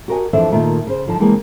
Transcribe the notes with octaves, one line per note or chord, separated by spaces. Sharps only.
F#4 G4 A#4 B4 D#5 G#5
F2 E3 D4 A4 C5 E5
A#2 D#3 A3 F4 E5
C#3 C5
D3 F3 D#4 A5
C#3 E3 G#3 A#3 C4